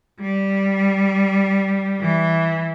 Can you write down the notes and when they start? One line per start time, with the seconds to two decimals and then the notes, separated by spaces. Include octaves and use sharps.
0.21 G3
2.00 E3